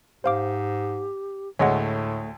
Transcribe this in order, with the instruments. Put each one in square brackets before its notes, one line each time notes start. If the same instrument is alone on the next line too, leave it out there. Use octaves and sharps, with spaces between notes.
[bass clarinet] G#2 [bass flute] G4 [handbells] C5 F5 D6
[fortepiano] D2 G#3 [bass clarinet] A2 [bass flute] A3 [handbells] C#5 D#5 F#5